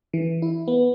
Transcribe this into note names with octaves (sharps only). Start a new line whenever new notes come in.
E3
E4
B3